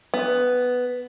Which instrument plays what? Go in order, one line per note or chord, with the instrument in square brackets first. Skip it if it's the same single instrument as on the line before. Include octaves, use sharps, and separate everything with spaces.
[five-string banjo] B3